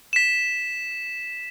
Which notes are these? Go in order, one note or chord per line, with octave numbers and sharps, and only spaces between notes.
B6 E7